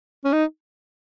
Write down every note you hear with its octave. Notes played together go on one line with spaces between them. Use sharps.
C#4
D#4